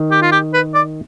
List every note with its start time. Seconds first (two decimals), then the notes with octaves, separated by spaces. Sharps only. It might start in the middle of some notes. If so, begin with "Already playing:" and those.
Already playing: D#3
0.11 G4
0.22 F4
0.32 G4
0.53 B4
0.74 D5